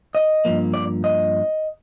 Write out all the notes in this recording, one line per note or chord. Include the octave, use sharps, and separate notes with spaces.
D#5
G2 F3 A#3
D5
D#5